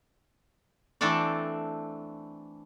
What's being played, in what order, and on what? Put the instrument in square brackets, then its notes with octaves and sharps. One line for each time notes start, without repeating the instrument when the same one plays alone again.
[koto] E3 A3 C4 D4 A4 D5